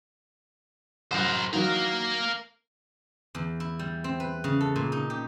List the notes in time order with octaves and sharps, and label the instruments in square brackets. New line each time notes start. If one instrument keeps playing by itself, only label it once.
[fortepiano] C2 F#2 [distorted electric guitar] A#4 C5
[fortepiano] D#3 E3 F#3 [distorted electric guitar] A#4 F5
[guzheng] E2
E4
G3
C4
B4
C#3
A4
A#2
D#4
G4